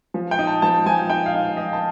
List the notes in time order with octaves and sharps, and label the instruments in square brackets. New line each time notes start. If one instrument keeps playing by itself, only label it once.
[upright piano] F3
G5
D#4
A5
F3 A5
F3 G#5
D#4 G5
F5
D#4
F3 D#5
A5